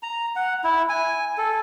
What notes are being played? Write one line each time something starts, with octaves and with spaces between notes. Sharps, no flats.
A#5
F#5
E4
G#5
A4